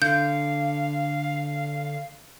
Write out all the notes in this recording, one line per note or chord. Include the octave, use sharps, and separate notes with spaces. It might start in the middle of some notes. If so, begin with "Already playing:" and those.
D3 F5 G6